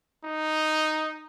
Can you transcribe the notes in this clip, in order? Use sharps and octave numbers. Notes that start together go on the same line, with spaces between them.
D#4